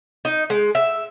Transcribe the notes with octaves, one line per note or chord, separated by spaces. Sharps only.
D#4
G#3
E5